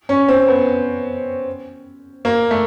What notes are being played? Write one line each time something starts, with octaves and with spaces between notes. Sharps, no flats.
C#4
C4
B3
A#3
A3